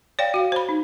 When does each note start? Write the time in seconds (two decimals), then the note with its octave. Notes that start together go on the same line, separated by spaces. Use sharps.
0.19 C#5 D5 F5 G5
0.34 F#4 F5
0.52 C5 B5
0.69 D#4